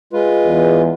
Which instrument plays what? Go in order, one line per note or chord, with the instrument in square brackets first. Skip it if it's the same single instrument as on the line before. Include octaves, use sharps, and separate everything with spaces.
[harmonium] G#3 F4 B4
[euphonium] E2